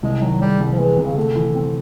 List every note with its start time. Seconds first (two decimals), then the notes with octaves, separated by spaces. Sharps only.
0.03 C2 G#3
0.22 D#3 F#3
0.41 G3 G#3
0.60 C2
0.73 F3
0.79 E3 G#3
0.98 C3
1.06 C#3
1.16 D3 A3
1.36 E3
1.55 C4